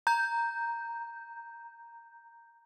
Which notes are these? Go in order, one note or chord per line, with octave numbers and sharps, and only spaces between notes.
A#5 G6